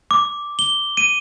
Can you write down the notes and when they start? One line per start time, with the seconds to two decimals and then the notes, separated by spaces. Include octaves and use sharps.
0.11 D6
0.59 G7
0.97 D#7